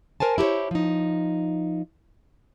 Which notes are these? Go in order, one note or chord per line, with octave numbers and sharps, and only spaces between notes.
A#4 C5 G#5 A5
E4 G4 A#4 C5 C#5
F3 D#4